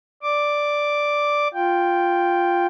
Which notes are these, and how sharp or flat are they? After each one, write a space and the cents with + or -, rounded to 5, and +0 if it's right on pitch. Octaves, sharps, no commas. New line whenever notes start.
D5 +0 D6 +0
F4 +0 G5 +0